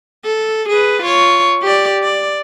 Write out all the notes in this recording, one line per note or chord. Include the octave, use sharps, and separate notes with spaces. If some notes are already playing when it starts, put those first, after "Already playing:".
A4
G#4 B4
F4 C#5
G4 D5
D5